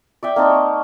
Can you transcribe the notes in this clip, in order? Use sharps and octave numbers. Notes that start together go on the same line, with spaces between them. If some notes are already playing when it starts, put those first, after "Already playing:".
D5 E5 G5
A#3 C4 D#4 A5
C#5